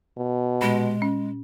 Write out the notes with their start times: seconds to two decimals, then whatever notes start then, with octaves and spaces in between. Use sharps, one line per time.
0.18 B2
0.62 A#2 G#3
1.02 C#4